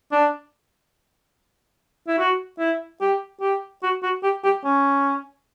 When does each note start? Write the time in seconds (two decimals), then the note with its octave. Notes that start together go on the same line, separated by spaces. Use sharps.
0.12 D4
2.08 E4
2.18 F#4
2.59 E4
3.01 G4
3.41 G4
3.83 F#4
4.03 F#4
4.24 G4
4.44 G4
4.65 C#4